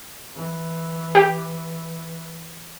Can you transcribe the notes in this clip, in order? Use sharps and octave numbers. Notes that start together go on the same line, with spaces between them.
E3
G4